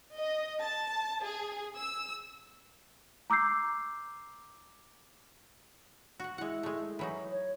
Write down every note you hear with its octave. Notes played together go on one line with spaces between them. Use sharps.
D#5
A5
G#4
E6
A#5 D6 E6 G6 C7
F#4 F#5
G#3 E4 F#5
G#3 A3
E3 F#3 D#4
C#5